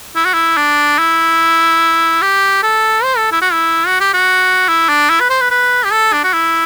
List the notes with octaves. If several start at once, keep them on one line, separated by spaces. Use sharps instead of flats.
E4
F#4
E4
D4
E4
G4
A4
C5
A4
E4
F#4
E4
F#4
G4
F#4
E4
D4
E4
B4
C5
B4
B4
G4
A4
D4
F#4
E4